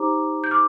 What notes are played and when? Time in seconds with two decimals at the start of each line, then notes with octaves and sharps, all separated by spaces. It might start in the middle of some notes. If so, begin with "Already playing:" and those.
Already playing: D#4 G4 C5 A#5 D6
0.44 G6
0.51 D6 F6